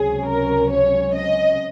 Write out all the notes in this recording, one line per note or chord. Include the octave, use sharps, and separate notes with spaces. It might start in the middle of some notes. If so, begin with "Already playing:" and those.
Already playing: C#2 C3 F#3 C#4 G#4
A#4
C#5
D#5